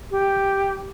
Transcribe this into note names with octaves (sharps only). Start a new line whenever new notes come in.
G4